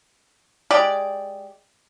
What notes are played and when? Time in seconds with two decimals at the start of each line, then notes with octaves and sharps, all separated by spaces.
0.71 G#3 G4 D5